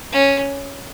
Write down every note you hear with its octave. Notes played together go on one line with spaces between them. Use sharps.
C#4